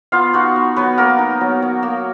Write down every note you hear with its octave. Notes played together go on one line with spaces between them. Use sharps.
B3 F4 F5
D#4 F#4 F#5
B3
F#3 B3 B4
A#3 B3 A#4
D#4
F#3
F#3
A#3